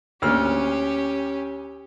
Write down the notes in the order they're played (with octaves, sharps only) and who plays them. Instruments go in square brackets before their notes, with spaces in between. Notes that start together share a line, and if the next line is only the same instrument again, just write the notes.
[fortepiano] D2 A#3 F6 [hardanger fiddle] C#4 G4